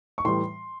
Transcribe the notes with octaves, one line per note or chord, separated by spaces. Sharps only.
C#6
A2 E3 G3 C6